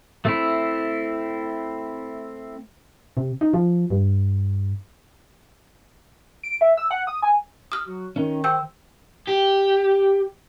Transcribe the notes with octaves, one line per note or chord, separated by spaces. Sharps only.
A3 C4 E4
C3
D#4
F3
G2
D7
E5
E6
F#5
D#6
G#5
D#6 F6
F#3 F#4
D#3 C#4 D#4
C5 G5 E6 G6
G4